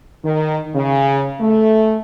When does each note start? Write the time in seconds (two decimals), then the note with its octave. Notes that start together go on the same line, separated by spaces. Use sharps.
0.24 D#3
0.75 C#3
1.40 A3